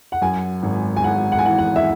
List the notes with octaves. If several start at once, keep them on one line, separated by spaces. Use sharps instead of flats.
F#5
F#2 G#5
G#1
G#5
G#1 F#5
F#5
G#5
E3 F#5
F#5
E5